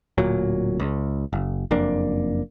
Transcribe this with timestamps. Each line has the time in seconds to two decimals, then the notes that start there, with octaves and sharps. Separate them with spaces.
0.18 D1 A#2 F#3
0.80 C#2
1.33 F#1
1.71 F#1 F2 A#3 D4